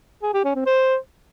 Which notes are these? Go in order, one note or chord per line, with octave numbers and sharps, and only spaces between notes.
G#4
G4
C#4
C4
C5